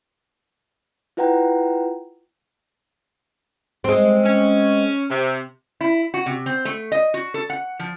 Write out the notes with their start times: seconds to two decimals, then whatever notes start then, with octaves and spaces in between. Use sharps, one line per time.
1.17 E4 F4 B4 F#5 G5 A#5
3.84 G#3 C4
4.24 C#4
5.10 C3
5.81 E4
6.14 F#4
6.26 C3
6.46 C4
6.65 A3
6.92 D#5
7.14 F#4
7.34 A4
7.50 F#5
7.79 F3